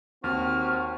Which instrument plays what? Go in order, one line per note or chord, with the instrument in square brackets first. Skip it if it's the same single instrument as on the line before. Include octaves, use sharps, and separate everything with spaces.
[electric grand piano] D#2 [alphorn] C4 [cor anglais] F#4 [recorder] F6